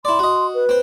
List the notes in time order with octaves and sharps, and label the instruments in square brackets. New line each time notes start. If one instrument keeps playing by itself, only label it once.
[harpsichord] E4 D5 [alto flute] C6
[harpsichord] F#4 D#5
[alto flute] B4
[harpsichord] C4 C5